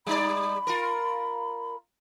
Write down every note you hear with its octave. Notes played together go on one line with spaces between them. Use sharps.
G3 D#4 D5 B5
F4 A#4